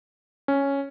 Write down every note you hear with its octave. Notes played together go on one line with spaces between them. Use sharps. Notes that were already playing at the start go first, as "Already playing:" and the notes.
C#4